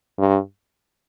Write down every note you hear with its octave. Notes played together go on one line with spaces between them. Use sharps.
G2